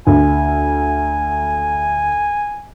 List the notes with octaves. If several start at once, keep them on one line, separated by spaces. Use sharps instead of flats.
D2 G#5